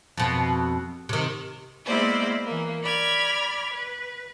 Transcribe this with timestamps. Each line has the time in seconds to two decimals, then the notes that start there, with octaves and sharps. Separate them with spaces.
0.17 F2 B2
1.09 C3 D#3
1.85 G#3 A#3 B3 E4 C5 D5
2.46 E3 A#3
2.82 D5 B5 F6 G#6
3.73 B4